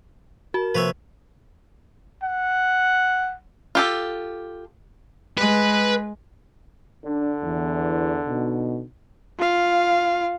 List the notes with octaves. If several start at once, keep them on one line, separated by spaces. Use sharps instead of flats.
F#4 A#4 A5
C3 F3 A#3 B4 C#5 E5
F#5
F4 G4 A4
G#3 B4
D3 D4
E2 E3
B2 D#4
F4 F5